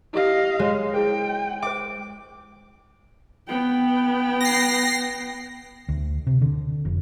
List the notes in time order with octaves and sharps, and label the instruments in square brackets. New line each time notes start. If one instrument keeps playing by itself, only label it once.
[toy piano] E4 G4 [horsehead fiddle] D#5 F5
[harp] G#3 [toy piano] F#4 C#5
[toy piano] E4 G#4 C5 [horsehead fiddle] G5
[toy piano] C5 E5 [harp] D6
[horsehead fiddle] B3 G5
[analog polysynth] A#6 C7
[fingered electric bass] D2
C3
D3
F1